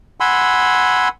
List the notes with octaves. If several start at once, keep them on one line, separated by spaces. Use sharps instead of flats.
F#5 G#5 B5 C6 E6